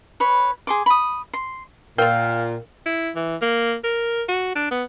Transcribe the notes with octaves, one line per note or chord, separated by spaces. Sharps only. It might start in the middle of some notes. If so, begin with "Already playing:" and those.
B4 C#5 B5
G#4 C6 D6
B5 D#6
C6
A#2 F4 A#4 F5 G5 F6
E4
E3
A#3
A#4
F#4
D4
B3